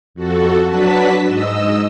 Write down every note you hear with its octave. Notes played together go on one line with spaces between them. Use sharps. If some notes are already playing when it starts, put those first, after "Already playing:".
F2 F#4 A4
F#3 D4 F#4 B4 A5 B6
G#2 D#5 E6